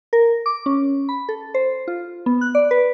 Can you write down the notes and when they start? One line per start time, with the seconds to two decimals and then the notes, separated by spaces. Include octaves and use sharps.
0.13 A#4
0.46 D6
0.66 C#4
1.09 B5
1.29 A4
1.54 C5
1.88 F4
2.26 B3
2.41 F#6
2.55 D5
2.71 B4